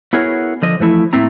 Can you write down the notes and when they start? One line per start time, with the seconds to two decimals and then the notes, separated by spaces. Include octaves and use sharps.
0.13 B3 E4 F#4 G#4 A#4 C#5
0.62 D3 F3 D#5
0.80 E3 F3 A3 E4
1.13 A2 A3 A#3 C4 E4 A#5